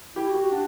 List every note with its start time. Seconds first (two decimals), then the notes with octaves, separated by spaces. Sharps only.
0.16 E4 G4
0.28 F#4
0.35 G4
0.40 F#4
0.52 D4 F#4